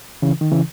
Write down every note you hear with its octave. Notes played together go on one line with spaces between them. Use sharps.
C#3 E3
D#3
C#3 E3